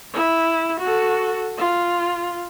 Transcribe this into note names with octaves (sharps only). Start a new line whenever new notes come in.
E4
F#4 A4
F4